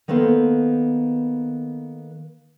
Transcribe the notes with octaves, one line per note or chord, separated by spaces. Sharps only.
D#3 A#3 B3 A4 C5